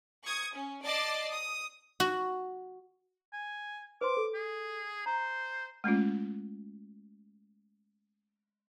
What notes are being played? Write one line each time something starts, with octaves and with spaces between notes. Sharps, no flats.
C#6 D#6 G#6
C#4
D5 D#5 A5 D6 A6 C7
D#6
F#4
G#5
B4 C5 C6 D6
A4
G#4
C5 A#5
G#3 A3 C#4 F4